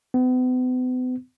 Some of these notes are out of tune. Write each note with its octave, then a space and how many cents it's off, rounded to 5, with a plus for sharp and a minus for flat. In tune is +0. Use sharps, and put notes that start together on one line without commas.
B3 +40